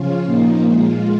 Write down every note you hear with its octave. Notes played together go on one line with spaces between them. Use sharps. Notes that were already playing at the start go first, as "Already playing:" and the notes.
Already playing: C#3 F3 C#4 F4
A#2 F3 A#3 D#4
A#2 G#3 F4